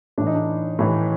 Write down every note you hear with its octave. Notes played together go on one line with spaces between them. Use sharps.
A2 E3 D4
D#4
D4
A2 E3